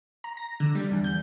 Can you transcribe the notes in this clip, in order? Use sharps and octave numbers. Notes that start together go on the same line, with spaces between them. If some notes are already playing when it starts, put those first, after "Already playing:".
A#5
A#6
D3
G3
E2
G6